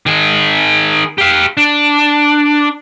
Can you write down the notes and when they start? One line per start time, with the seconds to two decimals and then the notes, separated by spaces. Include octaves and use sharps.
0.06 D#3 G#4
1.18 G4 F5
1.57 D4